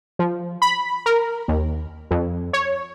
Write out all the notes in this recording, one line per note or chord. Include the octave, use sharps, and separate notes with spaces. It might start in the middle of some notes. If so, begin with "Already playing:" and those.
F3
B5
A#4
D#2
F2
C#5